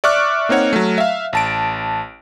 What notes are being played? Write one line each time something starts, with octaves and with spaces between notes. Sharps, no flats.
D5 E5 C#6 D6 F6 F#6
A#3 C4 D#4 C#5 F#5
F#3 A3
E5 F5
A1 A5 D7